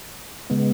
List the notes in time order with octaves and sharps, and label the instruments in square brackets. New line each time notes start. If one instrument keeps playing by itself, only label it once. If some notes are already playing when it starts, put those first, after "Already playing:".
[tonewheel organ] C#3 G#3 B3